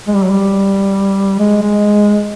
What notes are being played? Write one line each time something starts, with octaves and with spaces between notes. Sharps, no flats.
G#3
G3
F#3
G3
G#3
G#3